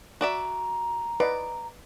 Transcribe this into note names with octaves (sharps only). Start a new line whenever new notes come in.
F#4 D5 E5 A#5
B4 D5 D#5